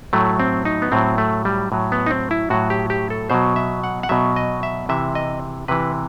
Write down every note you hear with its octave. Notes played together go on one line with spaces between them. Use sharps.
A2 F#3 A3
C4
D#4
B3
A2 F#3 C4
A3
G3
A2 F#3
B3
D#4
C4
E4
A2 F#3 F#4
G4
G4
A4
B2 F#3 C5
E5
F#5
F#5
B2 F#3 E5
D#5
E5
C3 E3 E5
D#5
C3 E3 B4